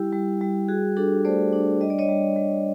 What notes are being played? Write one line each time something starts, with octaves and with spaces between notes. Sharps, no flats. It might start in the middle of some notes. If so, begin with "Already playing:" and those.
Already playing: G3 E4 G4
G3
G3
F#4 G#4
D4 G4 A4
A3 C5 D5
D4
G3 D#5
D5
C#5 D#5
G3
G3